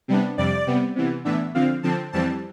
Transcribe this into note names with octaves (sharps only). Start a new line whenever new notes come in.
C3 G3 B3 D4
F2 C3 G3 D5
C3 G3 B3
C3 E3 B3
A2 E3 B3 D4 E5
D3 F3 C4 F5
D3 F3 C4 A5
F2 E3 G3 C4 A5